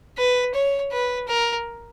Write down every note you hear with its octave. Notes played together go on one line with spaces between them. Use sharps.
B4
C#5
B4
A#4